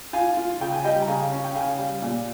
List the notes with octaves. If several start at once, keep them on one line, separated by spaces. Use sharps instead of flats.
F4 F5 G#5
F4
C#3 G5
G#5
G3 D#5 G5
A#5
C#3 F5 G#5
C#4
G5
C#3 F5 G#5
G3
A#2